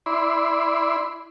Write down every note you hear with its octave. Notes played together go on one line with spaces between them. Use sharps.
E4 D5 B5 C6